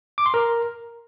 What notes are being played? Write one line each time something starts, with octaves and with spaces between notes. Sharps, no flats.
D6
C6
A#4